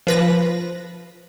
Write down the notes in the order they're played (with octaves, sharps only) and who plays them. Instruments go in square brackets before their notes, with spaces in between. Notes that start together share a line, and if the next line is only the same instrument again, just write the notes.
[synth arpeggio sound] F3 B4 A#6